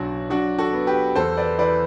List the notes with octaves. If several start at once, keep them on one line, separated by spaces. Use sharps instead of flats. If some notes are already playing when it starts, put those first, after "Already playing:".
Already playing: B1 F#3 D4 F#4
F#3 D4 F#4
F#4 A4
B3
G4 B4
E2 A4 C5
B4 D5
E3 B4 D5